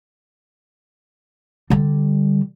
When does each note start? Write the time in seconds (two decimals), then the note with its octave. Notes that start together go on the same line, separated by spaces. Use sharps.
1.70 D3 G3